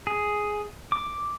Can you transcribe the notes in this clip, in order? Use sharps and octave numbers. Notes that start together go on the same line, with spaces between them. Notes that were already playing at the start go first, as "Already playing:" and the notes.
G#4
D6